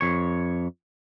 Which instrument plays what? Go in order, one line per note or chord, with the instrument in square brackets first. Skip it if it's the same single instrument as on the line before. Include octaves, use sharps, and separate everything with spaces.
[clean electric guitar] F2 C#5